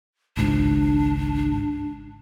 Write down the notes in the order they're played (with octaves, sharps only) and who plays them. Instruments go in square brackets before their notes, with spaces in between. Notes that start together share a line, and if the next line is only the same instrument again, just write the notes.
[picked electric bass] G#1 C#2 G#2 [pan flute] D4